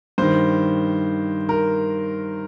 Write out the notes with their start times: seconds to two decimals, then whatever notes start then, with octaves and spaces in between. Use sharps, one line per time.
0.18 G2 D#3 C5
1.49 A#4